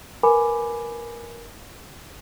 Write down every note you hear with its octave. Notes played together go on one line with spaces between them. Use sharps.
A#4 B4 G#5 B5 D6